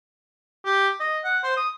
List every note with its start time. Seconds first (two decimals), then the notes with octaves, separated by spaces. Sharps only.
0.65 G4
1.00 D#5
1.24 F#5
1.44 C5
1.57 D#6